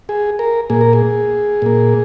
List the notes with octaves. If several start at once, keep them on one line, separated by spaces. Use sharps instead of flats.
G#4
A#4
A#2 A#3 G#4
A#4
G#4
A#2 A#3